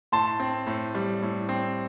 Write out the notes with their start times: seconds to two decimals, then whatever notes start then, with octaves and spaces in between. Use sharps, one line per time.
0.12 A2 A5 C6
0.40 C4
0.67 A2
0.95 G3
1.22 A2
1.49 C4